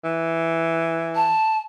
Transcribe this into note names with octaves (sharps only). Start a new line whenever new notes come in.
E3
A5